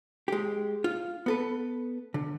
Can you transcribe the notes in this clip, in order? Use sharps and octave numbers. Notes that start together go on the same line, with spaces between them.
G#3 G4
F4
B3 A4 B4
D3